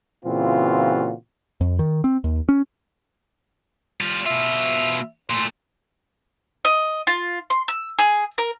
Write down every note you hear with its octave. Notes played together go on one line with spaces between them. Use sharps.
A#2 C#3 E3 C4 F4 F#4
F2
D#3
C4
D#2
C#4
G3 F4
B2 F4 E5
A#2 A3 C6
D#5
F4
C6
E6
G#4
A#4